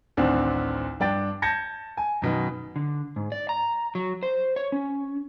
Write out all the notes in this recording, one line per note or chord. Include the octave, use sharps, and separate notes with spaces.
A1 D2 D#3 C4 D4
G2 D4 G5 A6
A5 G6 G#6 A#6 C#7
G#5
F#2 B2 D#3
D3
G#2
D5
A#5
F#3
C5
C#5
C#4